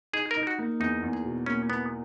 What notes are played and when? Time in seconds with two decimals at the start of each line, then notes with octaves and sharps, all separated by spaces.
0.13 D#4 G#4
0.31 A#4
0.36 D#4
0.47 F#4
0.59 A#3
0.80 E2 D#4
1.02 E2
1.13 G#4
1.25 B2
1.46 A#3 C#4
1.69 A#3 B3